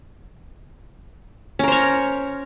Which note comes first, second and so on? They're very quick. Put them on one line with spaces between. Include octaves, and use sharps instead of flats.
C#4 A#4 C5 C#5